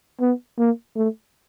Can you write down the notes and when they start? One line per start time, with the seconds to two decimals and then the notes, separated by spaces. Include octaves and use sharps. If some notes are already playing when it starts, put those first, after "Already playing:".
0.20 B3
0.58 A#3
0.96 A3